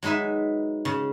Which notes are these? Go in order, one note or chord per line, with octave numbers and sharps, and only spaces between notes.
F#3 G#3 D#4 B4 E5
C#3